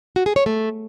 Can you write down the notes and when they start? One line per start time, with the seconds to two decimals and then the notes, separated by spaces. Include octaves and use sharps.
0.16 F#4
0.26 G#4
0.36 C#5
0.46 A3